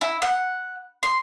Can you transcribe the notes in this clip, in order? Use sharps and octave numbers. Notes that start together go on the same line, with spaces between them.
E4
F#5
C6